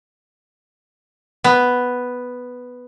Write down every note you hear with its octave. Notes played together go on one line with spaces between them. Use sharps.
B3